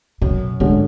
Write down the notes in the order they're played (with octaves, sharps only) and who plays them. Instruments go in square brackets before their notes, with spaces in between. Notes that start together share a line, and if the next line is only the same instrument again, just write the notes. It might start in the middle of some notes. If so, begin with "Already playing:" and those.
[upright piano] F#2 [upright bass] B2
[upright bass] G#2 [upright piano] D3 G#3 C#4